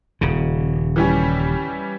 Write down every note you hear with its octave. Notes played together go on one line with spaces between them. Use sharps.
D#1 C#3
E3 G3 C#4